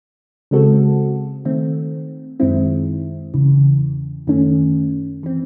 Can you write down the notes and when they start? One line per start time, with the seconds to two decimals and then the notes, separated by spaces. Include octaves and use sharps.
0.51 C#3 G#3 C4 F#4 A4
1.45 D#3 A3 C4
2.40 F#2 D#3 G#3 C4 E4
3.34 E2 C#3 E3
4.27 F#2 D#3 A3 C#4
5.23 E3 C4